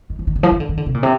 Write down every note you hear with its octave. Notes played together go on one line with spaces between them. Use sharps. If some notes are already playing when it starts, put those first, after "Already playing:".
D#3
F3
D#3
D3
F3
D#3
D3
D#3
D3
C3
A#2
C3